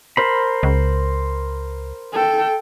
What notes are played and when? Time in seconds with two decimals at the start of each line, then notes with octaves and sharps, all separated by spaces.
0.17 A#4 C5 B5
0.63 C#2
2.13 A4 G5